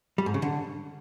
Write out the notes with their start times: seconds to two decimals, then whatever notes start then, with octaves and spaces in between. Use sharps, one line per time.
0.18 G3
0.26 G#2
0.34 C#3
0.42 D3